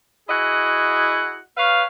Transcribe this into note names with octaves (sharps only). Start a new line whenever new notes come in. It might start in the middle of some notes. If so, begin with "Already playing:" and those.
E4 F#4 G#4 D#5 F#5
B4 C#5 F5